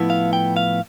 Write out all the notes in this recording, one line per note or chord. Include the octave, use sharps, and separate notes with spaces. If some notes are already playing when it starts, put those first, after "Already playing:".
Already playing: A2 F3 B3 E4
F5
G5
F5